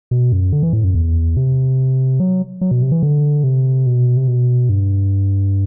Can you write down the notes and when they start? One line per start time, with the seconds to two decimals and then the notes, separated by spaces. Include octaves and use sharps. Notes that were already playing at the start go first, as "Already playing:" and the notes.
0.11 B2
0.32 F#2
0.53 D3
0.63 E3
0.73 A2
0.84 F#2
0.94 E2
1.37 C3
2.20 F#3
2.61 F#3
2.71 B2
2.82 C3
2.92 E3
3.03 D3
3.44 C3
3.87 B2
4.17 C3
4.28 B2
4.69 G2